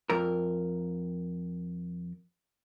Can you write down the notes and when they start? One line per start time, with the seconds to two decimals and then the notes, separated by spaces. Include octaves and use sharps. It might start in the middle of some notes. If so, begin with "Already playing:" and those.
0.10 F2 A#4